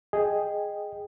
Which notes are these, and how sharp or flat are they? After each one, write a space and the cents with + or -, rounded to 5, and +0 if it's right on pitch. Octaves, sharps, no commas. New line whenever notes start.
G#4 +0 D#5 -10 G5 +0